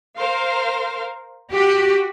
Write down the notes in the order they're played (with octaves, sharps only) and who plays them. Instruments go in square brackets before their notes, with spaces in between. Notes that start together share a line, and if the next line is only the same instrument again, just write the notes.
[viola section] A#4 C5 F5
[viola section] F#4 [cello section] G4